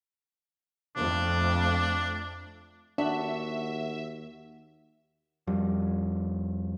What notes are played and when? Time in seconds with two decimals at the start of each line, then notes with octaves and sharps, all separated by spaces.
0.96 F2 A3 D4
2.98 D#2 D4 F#4 E5
5.47 F2 G3